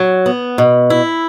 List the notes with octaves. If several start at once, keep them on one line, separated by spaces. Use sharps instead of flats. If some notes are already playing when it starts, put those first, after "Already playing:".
Already playing: F#3
B3
B2
E4